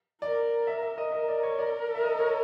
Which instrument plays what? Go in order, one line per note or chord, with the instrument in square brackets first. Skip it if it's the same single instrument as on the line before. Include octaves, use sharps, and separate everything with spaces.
[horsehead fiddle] A#4 [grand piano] D5
[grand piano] E5
E5
D#5
[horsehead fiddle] A#4 [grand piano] D#5
[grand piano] D5
C#5
D5
E5
D#5
C#5